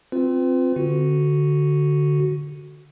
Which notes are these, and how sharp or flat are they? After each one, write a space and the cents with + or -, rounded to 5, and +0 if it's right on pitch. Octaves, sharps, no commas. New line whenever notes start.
C4 +0 F4 +0 B4 +40
D3 +0 F#4 +0